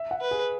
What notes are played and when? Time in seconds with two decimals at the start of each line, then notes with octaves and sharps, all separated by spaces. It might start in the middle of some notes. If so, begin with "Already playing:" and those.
Already playing: E5
0.11 F#5
0.21 B4
0.31 G#4